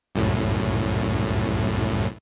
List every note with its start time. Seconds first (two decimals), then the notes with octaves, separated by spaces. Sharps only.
0.15 C2 F#2 A2